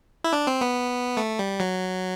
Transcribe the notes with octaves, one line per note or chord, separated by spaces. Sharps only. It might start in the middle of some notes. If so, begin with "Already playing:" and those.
E4
D4
C4
B3
A3
G3
F#3